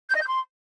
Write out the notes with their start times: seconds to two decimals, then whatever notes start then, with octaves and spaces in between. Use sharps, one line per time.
0.09 G6
0.15 D#5
0.21 G6
0.27 C6